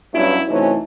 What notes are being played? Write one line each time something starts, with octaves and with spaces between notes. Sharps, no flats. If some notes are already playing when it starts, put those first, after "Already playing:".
G2 F#3 B3 C#4 E4
C3 E3 F#3 A3 C#4 D#4